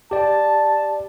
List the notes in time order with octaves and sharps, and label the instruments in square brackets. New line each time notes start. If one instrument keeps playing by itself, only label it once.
[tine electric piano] G4 D5 [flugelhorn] A5